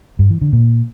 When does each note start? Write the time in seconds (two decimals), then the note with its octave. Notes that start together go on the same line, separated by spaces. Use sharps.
0.19 G2
0.30 E3
0.41 D3
0.53 A#2